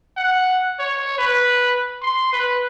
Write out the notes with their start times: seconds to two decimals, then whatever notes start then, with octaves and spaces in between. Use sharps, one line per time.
0.17 F#5
0.79 C#5
1.18 B4
2.02 C6
2.32 B4